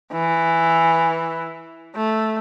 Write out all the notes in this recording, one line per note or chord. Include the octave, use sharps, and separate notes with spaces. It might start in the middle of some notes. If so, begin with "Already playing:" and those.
E3
A3